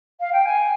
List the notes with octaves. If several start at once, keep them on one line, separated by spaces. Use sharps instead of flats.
F5
G5
G#5